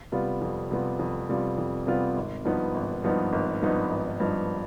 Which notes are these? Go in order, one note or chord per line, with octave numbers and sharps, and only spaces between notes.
C3 G3 B3 F4
F2
C3 G3 B3 F4
F2
C3 G3 B3 F4
F2
C3 G3 B3 F4
G#1
G2 F3 B3 D#4
G#1
G2 F3 B3 D#4
G#1
G2 F3 B3 D#4
G#1
G2 F3 B3 D#4